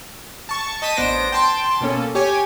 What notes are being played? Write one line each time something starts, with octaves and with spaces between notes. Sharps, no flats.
A5 C#6
D#5 A5 G6 B6 D#7
A1 B3 D4 C5 A#6 D7
G5 A5 C6
B2 A#3 C#4 A4
G4 C#5 G#5